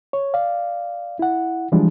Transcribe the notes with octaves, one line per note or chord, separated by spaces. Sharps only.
C#5
D5 F5
E4 F#5
E3 F3 G3 G#3 D4